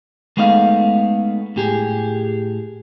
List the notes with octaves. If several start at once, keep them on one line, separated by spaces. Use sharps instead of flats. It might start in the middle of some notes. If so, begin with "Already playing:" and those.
G#3 A3 B3 D#4 D5 F5
A2 G4 G#4